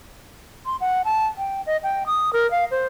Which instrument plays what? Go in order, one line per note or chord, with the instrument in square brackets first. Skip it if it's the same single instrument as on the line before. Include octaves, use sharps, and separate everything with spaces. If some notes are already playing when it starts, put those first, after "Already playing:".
[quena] C6
F#5
A5
G5
D#5
G5
D#6
A#4
F5
C5